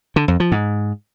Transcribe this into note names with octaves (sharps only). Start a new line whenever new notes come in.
D3
F2
F3
G#2